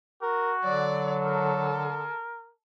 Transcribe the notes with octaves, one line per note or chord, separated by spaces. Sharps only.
F#4 A#4
D3 F#3 D5
A4 A#4